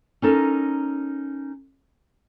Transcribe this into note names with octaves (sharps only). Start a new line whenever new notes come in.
C#4 D#4 A4 A#4